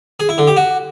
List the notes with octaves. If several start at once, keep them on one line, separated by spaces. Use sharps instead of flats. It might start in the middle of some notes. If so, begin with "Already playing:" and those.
G#4
E4
D3
G4
F#4